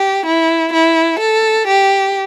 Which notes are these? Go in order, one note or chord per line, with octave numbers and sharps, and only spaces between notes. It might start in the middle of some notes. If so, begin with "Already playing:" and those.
Already playing: G4
E4
E4
A4
G4